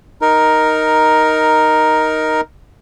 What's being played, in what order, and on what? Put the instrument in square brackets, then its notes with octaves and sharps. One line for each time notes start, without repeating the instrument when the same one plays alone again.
[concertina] D#4 A#4